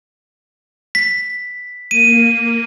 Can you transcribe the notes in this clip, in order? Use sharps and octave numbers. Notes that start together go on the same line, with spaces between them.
B6
A#3 D#7